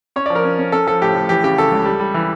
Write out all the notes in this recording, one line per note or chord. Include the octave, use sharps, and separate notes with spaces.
C#4 C#5
D5
F3
A#4
C#4
C#4
C#4 A4
F3 A4
A2 G4
A2
E3 G4
C#3 G4
C#3 A4
C#2
G3
G3
E3